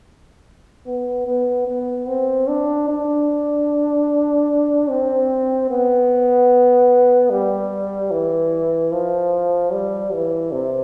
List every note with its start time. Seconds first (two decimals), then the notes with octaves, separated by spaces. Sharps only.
0.86 B3
1.26 B3
1.67 B3
2.08 C4
2.48 D4
2.88 D4
4.90 C4
5.70 B3
7.30 G3
8.11 E3
8.92 F3
9.72 G3
10.13 E3
10.52 C3